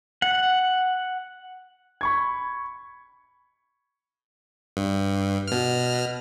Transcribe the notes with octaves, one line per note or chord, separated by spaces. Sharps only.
F#5
B5 C#6 G#6
G2
B2 F6